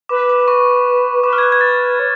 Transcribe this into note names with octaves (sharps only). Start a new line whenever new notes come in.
B4 D6
D6
C#6
B4 D6
F6
G#6
F#6
G#6
A6
C#5